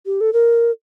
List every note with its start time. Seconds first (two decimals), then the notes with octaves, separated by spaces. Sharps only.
0.06 G4
0.21 A4
0.33 A#4